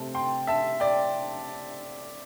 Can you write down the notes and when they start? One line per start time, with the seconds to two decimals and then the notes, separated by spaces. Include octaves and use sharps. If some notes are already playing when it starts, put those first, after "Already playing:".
Already playing: C3 A3 C4 A5
0.15 G5 C6
0.47 E5 A5
0.80 D5 G5